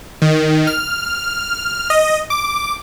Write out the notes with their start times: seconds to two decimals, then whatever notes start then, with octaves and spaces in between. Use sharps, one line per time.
0.22 D#3
0.67 F6
1.90 D#5
2.30 D6